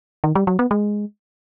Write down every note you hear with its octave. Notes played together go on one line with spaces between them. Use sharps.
D#3
G3
F#3
B3
G#3